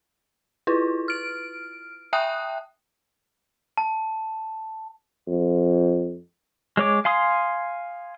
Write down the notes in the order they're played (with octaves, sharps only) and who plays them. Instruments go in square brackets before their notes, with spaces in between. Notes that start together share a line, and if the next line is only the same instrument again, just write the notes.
[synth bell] E4 F4 B4
F6 D7
E5 G5 A5 D#6 F#6
[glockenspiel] A5
[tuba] F2
[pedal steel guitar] G#3 C#5 D6
F5 G#5 C6 D#6